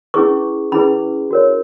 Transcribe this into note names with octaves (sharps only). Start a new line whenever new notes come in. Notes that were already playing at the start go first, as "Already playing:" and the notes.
C#4 E4 G#4 B4 C#6
C#4 E4 G#4 B4 B5
F#4 A#4 C#5